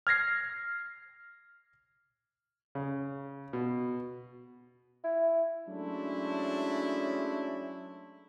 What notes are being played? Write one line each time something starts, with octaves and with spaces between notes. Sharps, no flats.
F6 G#6 A#6 C7
C#3
B2
E4
F#3 G#3 A3 C#4 D4 E4